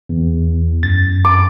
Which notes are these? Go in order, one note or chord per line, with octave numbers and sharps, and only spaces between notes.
E2
F#2 A6
D6